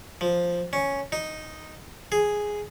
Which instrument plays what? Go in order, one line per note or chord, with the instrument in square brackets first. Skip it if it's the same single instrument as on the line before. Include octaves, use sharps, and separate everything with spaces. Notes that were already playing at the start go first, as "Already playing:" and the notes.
[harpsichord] F3
C#4
D#4
G#4